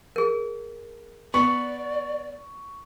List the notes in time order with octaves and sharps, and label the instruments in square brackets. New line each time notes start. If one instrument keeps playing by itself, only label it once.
[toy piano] G#4 A#4
[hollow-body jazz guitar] B3 [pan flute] D5 [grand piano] C#6